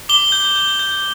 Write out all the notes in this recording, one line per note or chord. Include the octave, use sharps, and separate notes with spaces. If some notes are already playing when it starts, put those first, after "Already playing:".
D6 G7
G6
G6
G6